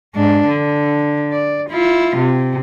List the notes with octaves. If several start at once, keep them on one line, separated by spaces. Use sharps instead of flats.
G#2 D4
D3
D5
E4 F4
C3